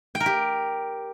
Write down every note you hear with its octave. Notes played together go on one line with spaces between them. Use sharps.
G5
A#4
G4